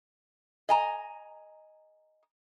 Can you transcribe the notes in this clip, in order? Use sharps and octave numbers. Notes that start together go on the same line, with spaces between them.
D#5 G#5 A#5